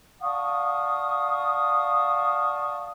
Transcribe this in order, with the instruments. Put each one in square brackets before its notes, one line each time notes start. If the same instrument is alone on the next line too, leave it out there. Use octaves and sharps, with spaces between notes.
[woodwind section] D5 F5 F#5 A5 C#6 D#6